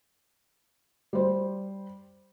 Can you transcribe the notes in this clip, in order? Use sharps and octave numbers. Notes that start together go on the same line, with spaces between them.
G3 C5